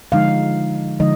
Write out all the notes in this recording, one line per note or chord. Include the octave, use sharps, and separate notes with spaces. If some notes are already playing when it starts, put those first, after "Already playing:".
D3 F3 G#3 D#4 F5
D3 F3 G#3 D#4 D#5